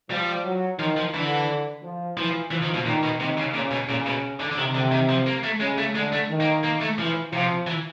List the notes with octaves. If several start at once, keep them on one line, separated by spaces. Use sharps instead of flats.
F3 G3
F#3
D#3 F3
F3
D3 E3
F3
E3 F3
E3 F3
D#3
B2
A#2 D#3
B2
C3 D#3
C#3
A#2 C#3
B2
A#2 C#3
B2
D3
D3
C3 D#3
D3
D#3
F3
A#3
A3
C#3 G#3
A3
D3 G#3
A3
D#3
A#3
A#3
A3
E3 F3
C3 F3
E3